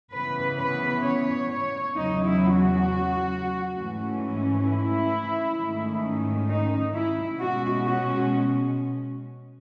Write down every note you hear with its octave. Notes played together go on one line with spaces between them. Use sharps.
C#3 E3 B3 B4
B4
C#5
C#5
E2 C#3 F#3 D#4
E4
F#4
G#2 E3 A3 C#4
E4
G#2 D#3 A3 C#4
D#4
E4
B2 G#3 C#4 F#4
F#4